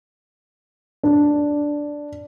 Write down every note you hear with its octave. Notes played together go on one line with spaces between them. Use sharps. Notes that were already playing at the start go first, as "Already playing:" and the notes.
D4